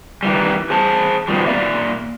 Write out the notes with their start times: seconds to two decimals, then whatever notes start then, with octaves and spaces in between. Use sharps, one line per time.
0.23 D#3 E3 G3
0.70 G#4 C5 A5
1.28 B2 D#3 F3 G3
1.46 A#3 D5 E5